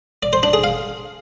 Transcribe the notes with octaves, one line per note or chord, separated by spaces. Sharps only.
D5
C5
D4
G#4
F5